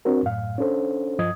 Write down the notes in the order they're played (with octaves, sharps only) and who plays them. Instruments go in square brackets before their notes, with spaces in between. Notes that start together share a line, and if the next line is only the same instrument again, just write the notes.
[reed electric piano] C4 D4 F#4 A#4
F#2 A2 F5
C#4 D4 A4 C5
G2 F3 D#5 D#6 G#6